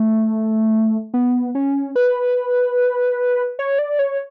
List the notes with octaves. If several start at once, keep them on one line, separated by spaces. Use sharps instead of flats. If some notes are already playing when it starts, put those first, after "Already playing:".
Already playing: A3
B3
C#4
B4
C#5
D5
C#5